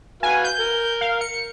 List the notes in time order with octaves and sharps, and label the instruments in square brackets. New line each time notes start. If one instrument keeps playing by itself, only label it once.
[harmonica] F#4 B4 F5 [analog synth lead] G#5
[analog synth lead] G6
[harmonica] A#4
[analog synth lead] F5
C#7